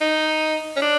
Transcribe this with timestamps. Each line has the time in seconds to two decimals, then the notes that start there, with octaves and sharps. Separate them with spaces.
0.01 D#4
0.76 C#4
0.82 D4